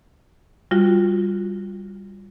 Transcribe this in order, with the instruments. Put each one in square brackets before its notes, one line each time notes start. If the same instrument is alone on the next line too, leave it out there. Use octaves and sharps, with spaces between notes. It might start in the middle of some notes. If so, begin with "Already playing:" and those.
[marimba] G3 F4 F#4